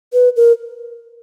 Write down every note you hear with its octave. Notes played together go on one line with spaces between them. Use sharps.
B4
A#4